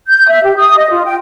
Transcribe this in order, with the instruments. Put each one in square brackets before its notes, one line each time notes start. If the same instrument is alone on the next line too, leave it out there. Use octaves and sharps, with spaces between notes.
[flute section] G6
E5
G4
D#6
D#5
F4
G5